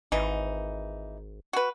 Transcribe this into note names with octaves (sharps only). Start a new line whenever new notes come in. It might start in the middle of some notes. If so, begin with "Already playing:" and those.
G#1 E3 D#4
F#4 B4